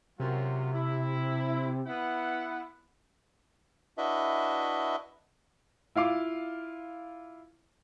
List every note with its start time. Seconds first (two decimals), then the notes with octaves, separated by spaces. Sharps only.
0.20 F#2 C3 F#3 F4
0.73 E4
1.86 B3 E4 F#5
3.98 D4 E4 F#4 B4 D#5 E5
5.95 E4 F4 F5 D6